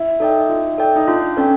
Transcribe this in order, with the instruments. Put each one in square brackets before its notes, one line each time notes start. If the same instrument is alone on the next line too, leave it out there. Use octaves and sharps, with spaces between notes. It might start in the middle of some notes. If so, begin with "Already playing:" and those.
Already playing: [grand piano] E4
[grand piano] D#4 [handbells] A4 D5 G5
[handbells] F4
A4 D5 G5
[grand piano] D#4
[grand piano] D4 [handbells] F4
[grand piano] C#4 [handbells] A4 D5 G5